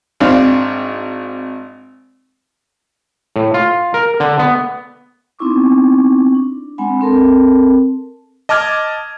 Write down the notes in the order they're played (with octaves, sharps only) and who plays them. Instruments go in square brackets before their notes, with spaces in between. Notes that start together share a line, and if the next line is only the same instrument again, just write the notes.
[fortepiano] G#1 C4 D4 F5
[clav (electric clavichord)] A2
F4
A#4
D3
B3
[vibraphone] B3 C4 D#4 E4 C#6 D6
D4
G#3 C4 D4 F#5 G#5 B5
C4 A4 A#4 A5
[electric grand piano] D#5 A5 D6 F6 G#6